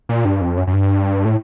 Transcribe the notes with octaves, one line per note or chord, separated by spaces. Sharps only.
A#2
G2
F2
F#2
F#2
G2
A2